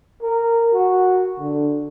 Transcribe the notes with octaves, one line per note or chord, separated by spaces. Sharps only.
A#4
F#4
D3